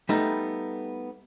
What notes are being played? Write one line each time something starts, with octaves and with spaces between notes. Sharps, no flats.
G3 A3 B3 D#4